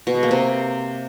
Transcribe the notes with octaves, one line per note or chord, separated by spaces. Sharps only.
B2
G#3
A#3
C3